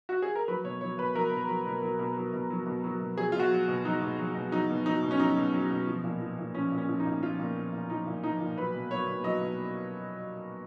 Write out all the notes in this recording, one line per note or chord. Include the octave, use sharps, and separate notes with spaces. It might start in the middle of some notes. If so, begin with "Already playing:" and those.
F#4
G#4
A#4
F#3 B4
B2 C#5
F#3 C#5
B2 B4
F#3 A#4
B2
F#3
B2
F#3
B2
F#3
B2
F#3
B2
F#3
B2
F#3 G#4
F4
B2 F#4
F#3
B2
F#3 D#4
B2
F#3
B2
F#3 D#4
B2
F#3 D#4
B2
C#4
F#3 D#4
B2
F#3
B2
F3
A#2
F3
A#2
F3 C#4
A#2
C#4
F3
D#4
A#2
F3 F4
A#2
F3
A#2
F3 D#4
A#2
F3 D#4
A#2
F#3 B4
B2
F#3 C#5
B2
F#3 D#5
B2